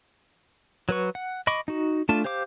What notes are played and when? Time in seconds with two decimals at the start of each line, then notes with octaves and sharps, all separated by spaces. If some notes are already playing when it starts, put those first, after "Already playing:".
0.89 F#3 B4 C#6
1.15 F#5
1.47 D#5 B5 C#6 D6
1.68 D#4 F#4
2.09 A3 D4 F4 A5
2.24 G4 C5 F5 D6